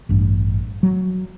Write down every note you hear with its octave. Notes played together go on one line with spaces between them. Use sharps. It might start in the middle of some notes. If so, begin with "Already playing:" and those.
A1 G2
F#3